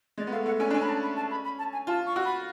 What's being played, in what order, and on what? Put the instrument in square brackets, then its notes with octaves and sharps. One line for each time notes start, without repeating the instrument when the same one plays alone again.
[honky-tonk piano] G#3 [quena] D5
[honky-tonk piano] B3
[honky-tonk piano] A3 [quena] F5
[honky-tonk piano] A3 [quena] F#5
[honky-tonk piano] C#4 [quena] G#5
[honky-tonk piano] D4
[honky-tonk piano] C#4 [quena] G#5
[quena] B5
A5
B5
A5
B5
B5
A5
G#5
[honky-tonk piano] F4 [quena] A5
[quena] C#6
[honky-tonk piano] F#4
[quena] B5